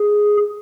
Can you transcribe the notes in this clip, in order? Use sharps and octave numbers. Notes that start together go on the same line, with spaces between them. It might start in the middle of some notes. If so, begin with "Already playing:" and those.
Already playing: G#4